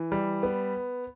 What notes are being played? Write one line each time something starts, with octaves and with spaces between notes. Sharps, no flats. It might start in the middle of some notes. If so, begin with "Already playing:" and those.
Already playing: E3
G3
B3